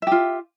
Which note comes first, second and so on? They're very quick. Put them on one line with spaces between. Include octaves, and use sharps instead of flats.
E5 G4 F4